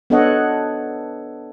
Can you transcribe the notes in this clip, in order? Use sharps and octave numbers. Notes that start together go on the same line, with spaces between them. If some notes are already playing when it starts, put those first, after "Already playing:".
B3 D4 A4 C#5 D#5 F#5